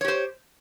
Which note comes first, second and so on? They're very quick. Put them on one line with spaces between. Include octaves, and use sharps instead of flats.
C#5 G4 C5